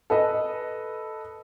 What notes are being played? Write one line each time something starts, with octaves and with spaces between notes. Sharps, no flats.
A4 B4 D#5